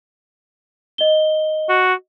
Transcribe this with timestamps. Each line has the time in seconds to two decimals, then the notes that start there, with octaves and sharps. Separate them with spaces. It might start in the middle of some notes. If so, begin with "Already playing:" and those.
0.98 D#5 G7
1.69 F#4